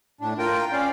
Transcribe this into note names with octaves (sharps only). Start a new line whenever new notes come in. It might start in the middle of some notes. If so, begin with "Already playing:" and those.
A2 D4
F4 A#4 G5
C#4 D5 F5